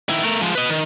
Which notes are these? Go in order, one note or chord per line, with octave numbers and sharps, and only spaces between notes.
D#3 E4
A3 A#4
F3 G#3
B4 D#5
D#3